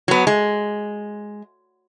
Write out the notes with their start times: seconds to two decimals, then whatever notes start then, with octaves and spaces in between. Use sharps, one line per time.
0.08 F#3 B3
0.27 G#3